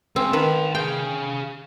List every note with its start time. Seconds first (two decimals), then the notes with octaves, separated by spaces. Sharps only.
0.16 C#3 G#3 C4
0.33 D#3 B4 A5 C6
0.75 G#4 F5 G5